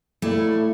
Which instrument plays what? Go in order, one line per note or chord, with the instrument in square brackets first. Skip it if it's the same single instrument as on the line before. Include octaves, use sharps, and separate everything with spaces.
[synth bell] G3 A#3 E4 A4 D5 [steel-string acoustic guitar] A3